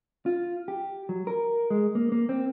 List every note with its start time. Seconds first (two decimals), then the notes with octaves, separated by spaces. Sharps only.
0.26 F4
0.68 G4
1.09 F#3
1.27 A#4
1.70 G#3
1.95 A#3
2.12 A#3
2.29 C4